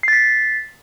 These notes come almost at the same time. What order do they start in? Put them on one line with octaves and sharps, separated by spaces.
C7 A6 B6